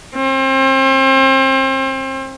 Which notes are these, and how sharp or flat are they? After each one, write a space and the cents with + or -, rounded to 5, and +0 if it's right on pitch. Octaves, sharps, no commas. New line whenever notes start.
C4 +35